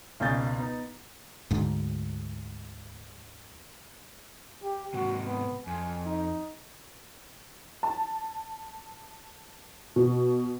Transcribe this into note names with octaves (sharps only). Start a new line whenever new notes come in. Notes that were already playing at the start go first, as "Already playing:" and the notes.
G#1 C#2 B2 G#5 G6 A6
B3 D#4
D2 G#2
G4
G#2 C3 F#4
B3
F2 G#5
D#4
A5
B2